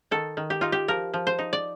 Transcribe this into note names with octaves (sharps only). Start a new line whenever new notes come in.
D#3 A4
D#3
G4
D#4 F4
G4
F3 A#4
F3
C5
D#4
D5